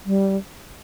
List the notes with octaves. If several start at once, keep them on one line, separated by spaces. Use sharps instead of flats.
G3